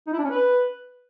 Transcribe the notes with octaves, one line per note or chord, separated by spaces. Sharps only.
D#4
E4
D4
C#4
B4